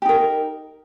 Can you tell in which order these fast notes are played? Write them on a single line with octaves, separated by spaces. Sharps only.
G4 D#4 A#4